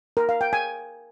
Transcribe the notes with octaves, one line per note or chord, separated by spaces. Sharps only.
A#4
F5
G5
G#5